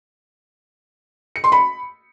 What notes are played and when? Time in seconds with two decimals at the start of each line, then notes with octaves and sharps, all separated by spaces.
1.36 C#7
1.44 C6
1.52 B5